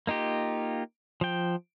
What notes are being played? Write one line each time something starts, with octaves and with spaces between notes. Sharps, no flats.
A#3 D#4 F4 G4
F3 G5